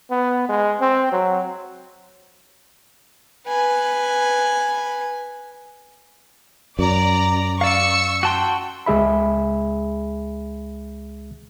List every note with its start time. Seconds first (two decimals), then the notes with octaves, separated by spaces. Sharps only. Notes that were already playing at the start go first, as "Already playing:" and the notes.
0.11 B3
0.49 G#3
0.80 C4
1.12 F#3
3.47 B4 G#5
6.79 F#2 D5 A#5
7.61 D5 F5 C#6 E6 C#7
8.23 F#4 G5 A5 C6
8.86 C#2 G#3 G#4 E5 B5